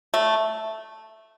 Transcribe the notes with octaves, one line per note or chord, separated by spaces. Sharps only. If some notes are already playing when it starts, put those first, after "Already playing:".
A3